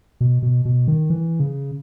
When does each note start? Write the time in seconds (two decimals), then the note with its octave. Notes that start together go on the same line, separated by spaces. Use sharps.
0.21 B2
0.42 B2
0.65 B2
0.88 D#3
1.10 E3
1.40 C#3